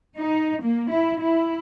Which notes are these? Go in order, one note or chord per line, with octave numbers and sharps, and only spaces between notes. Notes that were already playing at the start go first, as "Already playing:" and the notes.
D#4
A#3
E4
E4